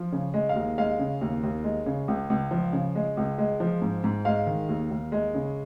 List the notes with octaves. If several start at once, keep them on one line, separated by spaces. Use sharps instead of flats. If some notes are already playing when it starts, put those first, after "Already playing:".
Already playing: F3
C#3
G#3
F5
D#2
G#3 F5
C#3
D#2
D#2
G#3
C#3
C#2
C#2
F3
C#3
G#3
C#2
G#3
F3
G#2
G#2
G#3 F5
D#3
D#2
D#2
G#3
C#3